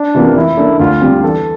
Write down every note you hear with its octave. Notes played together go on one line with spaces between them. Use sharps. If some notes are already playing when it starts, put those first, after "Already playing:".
Already playing: D4
C3 E3 A#3 F4
E3 E4
A#3 D4 A4
D2 F4
D3 G3 C4
E3 A4